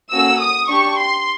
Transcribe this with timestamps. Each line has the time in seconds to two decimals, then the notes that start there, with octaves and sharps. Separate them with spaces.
0.12 A#3 C#4 F#4 A4 E6
0.41 D#6
0.69 D4 G4 C#6
0.98 C6